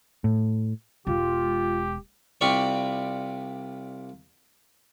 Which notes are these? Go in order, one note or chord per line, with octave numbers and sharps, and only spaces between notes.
A2
E1 G#3 F4 G4
C2 C4 F4 D5 B5 C#6